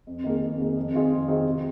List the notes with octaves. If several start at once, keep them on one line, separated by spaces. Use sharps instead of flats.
F2
D#3 A#3 G#4
F2
D#3 A#3 G#4
F2
D#3 C4 F4 G#4
F2
D#3 C4 F4 G#4
C3